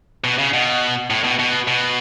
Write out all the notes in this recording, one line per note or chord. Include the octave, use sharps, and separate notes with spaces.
B2
C#3
B2
A2
B2
B2
B2